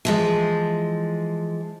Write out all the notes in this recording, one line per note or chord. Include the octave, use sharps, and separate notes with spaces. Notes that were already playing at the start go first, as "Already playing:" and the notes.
E3 F3 G#3